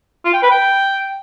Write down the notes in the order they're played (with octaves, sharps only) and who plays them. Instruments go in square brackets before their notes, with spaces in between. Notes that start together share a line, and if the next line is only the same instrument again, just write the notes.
[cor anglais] F4
G5
B4
G5